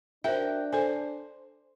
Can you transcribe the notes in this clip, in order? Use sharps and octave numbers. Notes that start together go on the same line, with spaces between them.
D4 F#4 A#4 C5 E5 G5
A4 C5 G#5